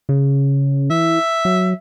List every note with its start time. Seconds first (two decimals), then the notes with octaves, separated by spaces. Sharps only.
0.09 C#3
0.90 E3 E5
1.45 F#3